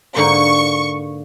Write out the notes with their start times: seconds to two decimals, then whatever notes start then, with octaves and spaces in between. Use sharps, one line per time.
0.16 G#2 D3 A#3 C#6